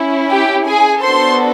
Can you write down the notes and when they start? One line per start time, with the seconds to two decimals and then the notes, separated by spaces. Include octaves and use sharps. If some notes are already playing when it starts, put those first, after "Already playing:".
Already playing: C#4 E4
0.31 G4 G5
0.67 G#4 G#5
1.03 B3 D4 F#4 A4 C5 C6